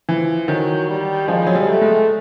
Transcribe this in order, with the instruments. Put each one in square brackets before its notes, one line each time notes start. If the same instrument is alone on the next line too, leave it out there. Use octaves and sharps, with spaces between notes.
[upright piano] E3 [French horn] F3
[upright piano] D#3 [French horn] F#3
[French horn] G3
[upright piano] F3 [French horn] G#3
[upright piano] F#3
G3
[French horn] A3
[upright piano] G#3